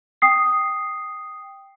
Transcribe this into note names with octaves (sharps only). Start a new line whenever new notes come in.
G5 D#6 C7